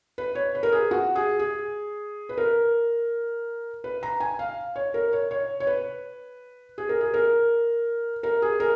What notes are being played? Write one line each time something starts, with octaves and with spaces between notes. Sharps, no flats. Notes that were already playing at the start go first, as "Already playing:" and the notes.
B4
C#5
B4
A#4
G#4
F#4
G#4
G#4
B4
A#4
B4
A#5
G#5
F5
C#5
A#4
C#5
C#5
C#5
B4
G#4
A#4
G#4
A#4
A#4
G#4
A#4